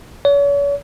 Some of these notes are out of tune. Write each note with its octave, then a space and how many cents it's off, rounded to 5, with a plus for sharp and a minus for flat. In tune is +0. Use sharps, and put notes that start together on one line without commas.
C#5 +40